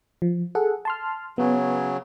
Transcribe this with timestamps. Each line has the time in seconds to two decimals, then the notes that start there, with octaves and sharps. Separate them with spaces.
0.22 F3
0.55 G#4 A4 F#5
0.85 A5 C6 F6
1.38 C#3 F#3 B3